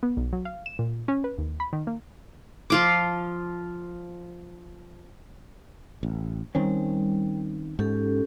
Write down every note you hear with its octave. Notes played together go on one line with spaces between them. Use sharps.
B3
B1
F#3
F5
E7
A#2
C#4
B4
D#2
B5
D#3
A#3
F3 F4 D6
A1
D#3 G3 C4 C#4
G#2 C#4 G4 A4